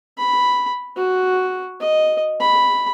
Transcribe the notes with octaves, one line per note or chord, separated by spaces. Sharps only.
B5
F#4
D#5
B5